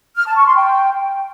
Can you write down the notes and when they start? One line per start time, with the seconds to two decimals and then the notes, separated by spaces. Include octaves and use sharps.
0.16 F6
0.26 A5
0.36 C#6
0.46 C6
0.56 G5